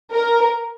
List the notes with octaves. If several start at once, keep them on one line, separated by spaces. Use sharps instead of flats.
A#4